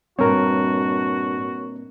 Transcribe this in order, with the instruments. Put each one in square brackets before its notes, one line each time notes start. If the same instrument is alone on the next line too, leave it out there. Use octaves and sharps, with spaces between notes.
[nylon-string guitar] G2 [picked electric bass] A#2 C4 [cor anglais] F#4 [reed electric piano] A#4 C#5